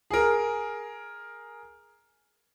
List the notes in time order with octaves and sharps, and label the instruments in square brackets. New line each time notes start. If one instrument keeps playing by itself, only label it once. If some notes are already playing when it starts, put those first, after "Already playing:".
[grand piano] G#4 A#4